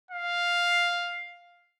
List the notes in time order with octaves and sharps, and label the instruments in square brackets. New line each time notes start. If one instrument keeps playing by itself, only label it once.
[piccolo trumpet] F5